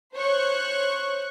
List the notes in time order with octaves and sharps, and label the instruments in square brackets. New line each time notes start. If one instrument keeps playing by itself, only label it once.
[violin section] C5 C#5 C#6 F#6